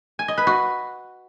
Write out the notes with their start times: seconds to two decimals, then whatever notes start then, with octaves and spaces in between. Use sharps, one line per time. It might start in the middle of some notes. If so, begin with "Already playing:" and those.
0.19 G#5
0.28 D#5
0.38 B4
0.47 F#4